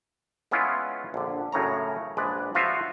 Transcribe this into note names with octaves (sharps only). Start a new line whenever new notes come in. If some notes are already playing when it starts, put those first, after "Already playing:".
G#3 B3 C#4 E4 F4
A#1 D3
F#2 A2 C#3 C#5 A#5
A#1 G#3 B4 D5
F3 F4 F#4 E5 F5